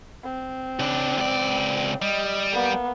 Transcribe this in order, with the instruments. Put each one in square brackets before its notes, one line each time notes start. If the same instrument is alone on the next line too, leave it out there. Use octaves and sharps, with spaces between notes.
[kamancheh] C4
[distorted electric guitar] C#3 D4
C#2 D5
[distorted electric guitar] G3 [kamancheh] D#5
[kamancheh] A#3 B3